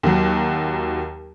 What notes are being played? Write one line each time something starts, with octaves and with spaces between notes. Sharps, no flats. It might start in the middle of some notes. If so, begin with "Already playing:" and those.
D#2 F#3